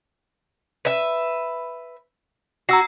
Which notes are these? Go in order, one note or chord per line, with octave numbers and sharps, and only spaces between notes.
B4 E5
F#4 A#5 E6 C7